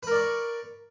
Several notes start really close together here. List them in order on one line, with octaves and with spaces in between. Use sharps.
B4 A#4 D5 C#6